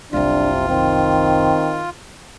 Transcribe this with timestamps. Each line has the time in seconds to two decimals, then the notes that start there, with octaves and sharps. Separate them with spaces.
0.13 F#1 C2 C3 D4 F4
0.68 D#3 C4